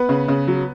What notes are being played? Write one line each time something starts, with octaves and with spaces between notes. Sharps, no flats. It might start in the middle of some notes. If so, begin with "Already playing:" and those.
Already playing: B3 B4
C#3
C#3
F#3